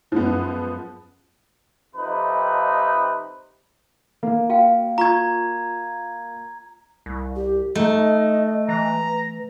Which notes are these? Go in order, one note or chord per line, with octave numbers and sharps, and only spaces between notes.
F#2 F3 G#3 B3
F2 C3 D#4 B4
A#3
F#4 F5 G5
F4 A#5 C#6 D#6 G#6
C2
G4
A3 D#4 D#5
E3 A#5